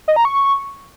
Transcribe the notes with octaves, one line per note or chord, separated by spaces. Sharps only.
D#5
A#5
C#6